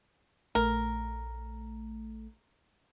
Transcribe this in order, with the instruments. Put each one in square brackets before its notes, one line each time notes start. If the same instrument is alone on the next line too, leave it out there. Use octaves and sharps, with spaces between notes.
[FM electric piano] A#1 A3 [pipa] A#4